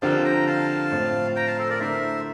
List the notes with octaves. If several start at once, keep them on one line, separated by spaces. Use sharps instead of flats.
D3 F3 C4 G4 A#4 F5 A5
G5 A#5
F5 A5
A2 F3 C4
G5 A#5
F5 A5
A4 C5
A#4 D5
D3 A3 E4 A#4 C5 E5